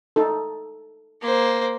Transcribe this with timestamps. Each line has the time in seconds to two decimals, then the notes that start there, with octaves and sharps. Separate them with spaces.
0.16 D#4 A4
1.22 A#3 C5